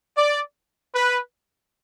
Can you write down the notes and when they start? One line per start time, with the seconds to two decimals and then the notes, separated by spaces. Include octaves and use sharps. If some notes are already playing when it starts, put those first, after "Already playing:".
0.16 D5
0.94 B4